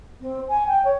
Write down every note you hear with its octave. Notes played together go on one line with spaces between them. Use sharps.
C4
G#5
G5
C#5